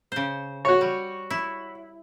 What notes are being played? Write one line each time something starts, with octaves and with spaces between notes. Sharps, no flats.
C#3 C5
F#4 C#5
G3
E4